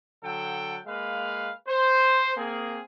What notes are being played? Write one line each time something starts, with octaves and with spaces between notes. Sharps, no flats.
D3 F#3 A4 F#5 G5
G#3 A#3 B4 F5
C5
A#3 C4 G#4